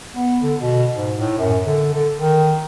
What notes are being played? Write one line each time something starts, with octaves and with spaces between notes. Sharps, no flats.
B3
D3
B2
G#2
A2
F#2
D3
D3
D#3